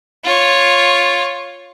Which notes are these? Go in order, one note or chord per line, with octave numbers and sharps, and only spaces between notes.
F4 C#5